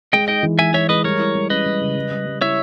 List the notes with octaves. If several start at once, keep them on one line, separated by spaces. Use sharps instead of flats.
G#3 D#5 G5
D#4 D#5 G5
E3
G#3 E5 G#5
G#3 C#5 E5
G#3 B4 D#5
G3 A#4 C#5
E4
G3
C#4 B4 D#5
G3
C#3
G3
G3
G3
E4 C#5 E5